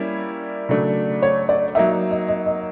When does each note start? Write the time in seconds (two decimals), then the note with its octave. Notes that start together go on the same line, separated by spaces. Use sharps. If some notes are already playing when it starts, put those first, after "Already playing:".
Already playing: G3 A#3 C#4 E4
0.69 C#3 F#3 A3 D4
1.22 C#5
1.49 D5
1.75 F#3 A#3 D#4 E5
2.11 D#5
2.28 D#5
2.46 D#5